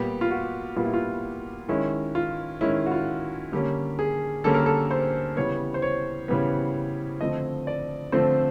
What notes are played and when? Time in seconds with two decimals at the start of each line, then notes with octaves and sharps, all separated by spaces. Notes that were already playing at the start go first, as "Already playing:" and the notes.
Already playing: A#2 G3 B3 G4
0.21 F4
0.31 F#4
0.76 A#2 G3 B3 F4
0.85 E4
0.94 F4
1.68 D#3 G#3 C#4 E4
2.15 F4
2.61 D#3 G#3 C#4 E4
2.86 F#4
2.91 F4
3.52 D3 G3 A#3 C#4 G4
3.99 G#4
4.44 D3 G3 A#3 C#4 A4
4.55 A#4
4.66 A4
4.91 C5
5.36 C#3 E3 G3 B3 C#5
5.74 C5
5.82 C#5
6.28 C#3 E3 G3 B3
7.20 D3 F3 A3 C4 D#5
7.67 D5
8.12 D3 F3 A3 C4 C5